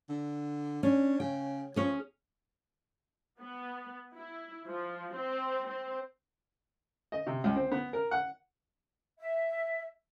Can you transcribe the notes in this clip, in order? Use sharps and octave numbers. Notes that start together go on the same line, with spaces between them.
D3
C#4 D4
C#3 G5
F3 C#4 G#4
B3
E4
F3
C4
C4
D#5
C3
C#2
C4
B3
A#4
F#5
E5